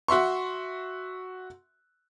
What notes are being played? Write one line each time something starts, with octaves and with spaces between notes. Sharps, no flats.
F#4 E5 C6 C#6